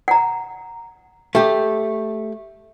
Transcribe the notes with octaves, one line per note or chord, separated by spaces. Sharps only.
F#5 A#5
A3 G4